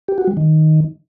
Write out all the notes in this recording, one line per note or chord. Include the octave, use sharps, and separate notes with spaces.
G4
F#4
G3
D#3